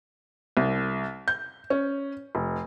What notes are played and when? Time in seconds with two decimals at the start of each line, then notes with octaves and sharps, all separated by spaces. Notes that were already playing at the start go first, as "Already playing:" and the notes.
0.57 C2
1.28 G6
1.70 C#4
2.35 F1